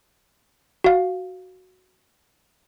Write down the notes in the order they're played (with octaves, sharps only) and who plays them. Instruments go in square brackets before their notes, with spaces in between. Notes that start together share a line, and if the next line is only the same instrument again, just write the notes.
[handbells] F#4 F5